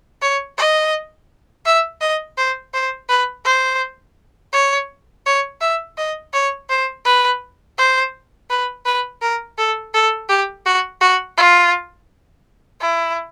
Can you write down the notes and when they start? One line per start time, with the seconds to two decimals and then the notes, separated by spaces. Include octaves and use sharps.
0.22 C#5
0.58 D#5
1.66 E5
2.01 D#5
2.38 C5
2.74 C5
3.09 B4
3.45 C5
4.53 C#5
5.26 C#5
5.61 E5
5.97 D#5
6.34 C#5
6.69 C5
7.05 B4
7.78 C5
8.50 B4
8.85 B4
9.22 A#4
9.58 A4
9.94 A4
10.29 G4
10.66 F#4
11.01 F#4
11.37 F4
12.81 E4